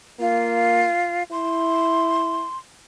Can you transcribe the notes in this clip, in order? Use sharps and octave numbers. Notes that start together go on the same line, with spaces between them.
A#3 F4
E4 C6